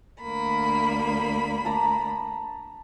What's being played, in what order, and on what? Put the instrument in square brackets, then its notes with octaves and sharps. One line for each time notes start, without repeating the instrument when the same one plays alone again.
[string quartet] D2 A#3 B5
[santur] A5 A#5 D6